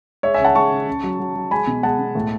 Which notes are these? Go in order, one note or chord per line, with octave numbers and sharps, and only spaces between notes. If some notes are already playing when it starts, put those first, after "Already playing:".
G#3 C#5 E5
E5 G#5
C#3 F#5 A5
G#3 A5 C#6
C#3
C#3
F#3
F#3
F#3
G#3 G#5 B5
B2
G#3 F#5 A5
B2
A2